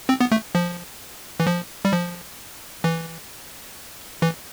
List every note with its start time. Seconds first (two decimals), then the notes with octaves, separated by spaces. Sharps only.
0.09 C4
0.21 B3
0.32 A3
0.55 F3
1.40 E3
1.47 F3
1.85 G3
1.93 F3
2.84 E3
4.22 E3